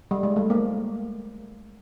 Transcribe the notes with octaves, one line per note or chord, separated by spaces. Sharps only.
G3
G#3
A3
A#3